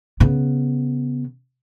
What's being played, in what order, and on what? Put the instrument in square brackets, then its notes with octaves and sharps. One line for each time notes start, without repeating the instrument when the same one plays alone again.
[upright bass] C#3 B3